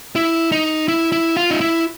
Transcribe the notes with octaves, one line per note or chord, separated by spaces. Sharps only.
E4
D#4
E4
E4
F4
D#4
E4